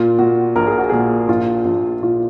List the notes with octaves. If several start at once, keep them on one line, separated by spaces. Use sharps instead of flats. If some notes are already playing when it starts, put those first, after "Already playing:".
Already playing: A#2 F4
A#2 F#4
A#1 A#4
G#4
F#4
A#2 G#4
A#1 F4
A#1
A#2 F4